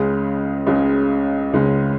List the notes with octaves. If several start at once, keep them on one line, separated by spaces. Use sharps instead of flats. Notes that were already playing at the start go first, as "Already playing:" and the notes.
Already playing: C#2 C#3 G#3 C#4
C#2 C#3 G#3 C#4
C#2 C#3 G#3 C#4